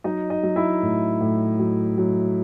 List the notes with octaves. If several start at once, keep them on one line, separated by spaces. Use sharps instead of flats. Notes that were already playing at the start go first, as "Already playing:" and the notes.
F#3 D#4 D#5
D#4 D#5
F#3
E4 E5
A2
A2
F#3
F#3